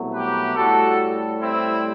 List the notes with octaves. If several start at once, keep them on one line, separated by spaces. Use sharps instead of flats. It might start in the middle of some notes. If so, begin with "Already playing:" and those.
Already playing: C2 B2 F#3 A3
G4 B4
A2 G3 F#4 A4
C4 E4